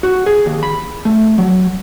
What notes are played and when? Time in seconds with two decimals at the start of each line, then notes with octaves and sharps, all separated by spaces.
0.03 F#4
0.26 G#4
0.46 D#2
0.63 B5
1.05 A3
1.38 F#3